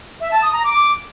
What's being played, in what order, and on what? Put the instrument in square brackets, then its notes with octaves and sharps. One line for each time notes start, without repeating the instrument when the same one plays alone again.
[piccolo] E5
A5
D#6
A#5
D6